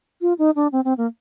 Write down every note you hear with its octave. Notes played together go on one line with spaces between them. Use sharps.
F4
D#4
D4
C4
C4
A#3